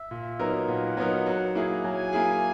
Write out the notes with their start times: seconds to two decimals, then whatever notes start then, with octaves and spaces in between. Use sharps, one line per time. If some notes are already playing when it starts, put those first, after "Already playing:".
Already playing: E5
0.11 A#2
0.39 F#3 B3 D#4 A#4
0.68 A#2 F#5
0.97 F#3 B3 D#4 A#4
1.26 F#3
1.55 A#3 E4 G#4
1.83 F#3 G#5
2.13 A#3 E4 G#4